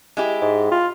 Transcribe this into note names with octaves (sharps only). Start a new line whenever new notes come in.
G#3 E4 G4
G#2
F4